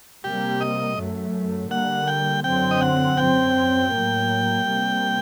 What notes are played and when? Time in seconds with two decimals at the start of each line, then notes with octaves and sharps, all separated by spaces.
0.24 C3 G3 A#3 G4
0.61 D#5
0.97 F#2 F#3 A3
1.71 D3 G3 A#3 F#5
2.07 G5
2.44 F#2 D3 F#3 C4 G5
2.71 D#5
2.81 F#5
3.17 F#2 F#3 C4 G5
3.91 A2 F#3 A#3
4.65 C3 G3 A#3